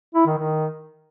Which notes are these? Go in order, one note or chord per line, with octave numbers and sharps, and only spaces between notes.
E4
D#3
D#3